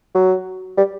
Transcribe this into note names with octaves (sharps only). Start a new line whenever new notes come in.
F#3
G3